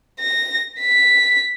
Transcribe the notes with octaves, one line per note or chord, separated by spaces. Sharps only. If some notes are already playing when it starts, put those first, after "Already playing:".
A#6
B6